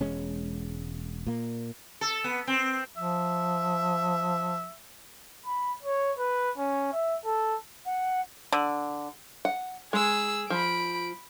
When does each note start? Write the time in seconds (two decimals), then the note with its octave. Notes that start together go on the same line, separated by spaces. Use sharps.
0.01 E1 G#3 C#4
1.27 A#2 A#3
2.01 A4
2.24 B3
2.47 C4
2.97 F3 E5
5.46 B5
5.82 C#5
6.19 B4
6.58 C#4
6.93 E5
7.25 A4
7.86 F#5
8.52 D3
9.45 F#5
9.93 G#3 G#4 E6
10.50 F3 B5 D7